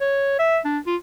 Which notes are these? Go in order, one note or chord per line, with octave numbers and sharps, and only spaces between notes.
C#5
E5
D4
F4